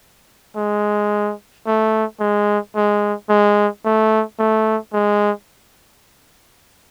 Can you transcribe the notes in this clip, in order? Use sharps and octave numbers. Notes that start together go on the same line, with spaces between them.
G#3
A3
G#3
G#3
G#3
A3
A3
G#3